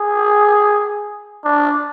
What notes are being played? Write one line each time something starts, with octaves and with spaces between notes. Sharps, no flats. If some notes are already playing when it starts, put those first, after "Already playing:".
Already playing: G#4
D4